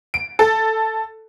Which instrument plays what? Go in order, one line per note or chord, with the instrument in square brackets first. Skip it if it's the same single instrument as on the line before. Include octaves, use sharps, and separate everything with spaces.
[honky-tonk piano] D7
A4